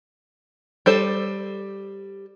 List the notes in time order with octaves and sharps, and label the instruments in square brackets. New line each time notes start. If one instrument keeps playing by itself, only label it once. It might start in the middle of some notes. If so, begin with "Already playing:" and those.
[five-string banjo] G3 A4 C5